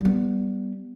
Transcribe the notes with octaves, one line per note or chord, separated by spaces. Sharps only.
G3 B3